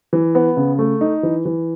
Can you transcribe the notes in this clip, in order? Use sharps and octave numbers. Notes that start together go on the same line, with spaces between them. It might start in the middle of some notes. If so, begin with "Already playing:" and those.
E3
B3
C#3
A3
D#4
E3
E3